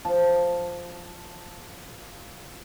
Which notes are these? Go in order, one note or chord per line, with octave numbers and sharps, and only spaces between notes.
F3 A5